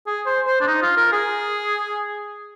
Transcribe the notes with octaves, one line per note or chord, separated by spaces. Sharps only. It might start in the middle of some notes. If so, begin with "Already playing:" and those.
G#4
C5
C5
D4
D#4
F4
A#4
G#4